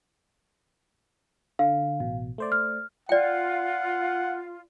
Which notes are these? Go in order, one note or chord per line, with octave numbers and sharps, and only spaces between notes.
D3 F5
A1 B2
A3 C5 D5
F6
F4 D5 F#5 G5